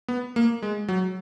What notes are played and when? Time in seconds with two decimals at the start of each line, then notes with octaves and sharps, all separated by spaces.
0.08 B3
0.36 A#3
0.62 G#3
0.88 F#3